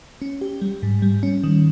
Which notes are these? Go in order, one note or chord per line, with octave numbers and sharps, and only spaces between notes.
C#4
G4
G3
G#2
G3
C#4
D#3